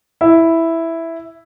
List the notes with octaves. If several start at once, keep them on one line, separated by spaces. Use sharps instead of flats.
E4